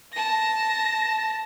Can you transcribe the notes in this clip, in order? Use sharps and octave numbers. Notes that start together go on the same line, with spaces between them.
A5 A#6